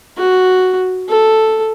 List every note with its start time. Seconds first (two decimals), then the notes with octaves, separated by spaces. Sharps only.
0.17 F#4
1.08 A4